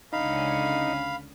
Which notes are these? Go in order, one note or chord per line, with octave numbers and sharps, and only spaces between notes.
C#2 D3 C#4 D#4 F5 B5